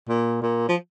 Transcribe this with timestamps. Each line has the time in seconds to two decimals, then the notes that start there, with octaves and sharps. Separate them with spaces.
0.09 A#2
0.42 A#2
0.69 F3